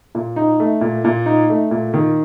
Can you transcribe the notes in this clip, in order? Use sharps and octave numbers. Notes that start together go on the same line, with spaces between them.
A#2
D#4
A3
A#2
A#2
D#4
A3
A#2
D#3